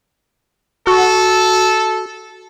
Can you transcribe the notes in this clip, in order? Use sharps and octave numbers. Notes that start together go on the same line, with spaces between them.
F#4 A4